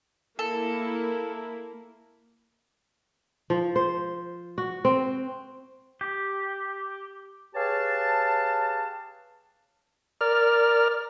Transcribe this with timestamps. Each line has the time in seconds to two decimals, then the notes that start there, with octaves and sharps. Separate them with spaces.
0.39 A#3 E4 A4
3.50 F3
3.76 C5
4.58 F#4
4.85 C4
6.01 G4
7.54 G4 G#4 B4 C#5 F5 A5
10.21 A#4 D5 F6